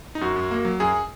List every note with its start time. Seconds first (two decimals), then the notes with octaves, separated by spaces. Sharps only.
0.15 D#4
0.21 F#2 F#4
0.36 F#2
0.51 A#3
0.65 F#3
0.80 F#2 G#4